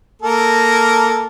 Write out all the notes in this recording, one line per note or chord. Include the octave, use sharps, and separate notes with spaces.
A#3 A4 A#4